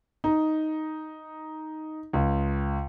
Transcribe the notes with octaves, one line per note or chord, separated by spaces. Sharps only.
D#4
C#2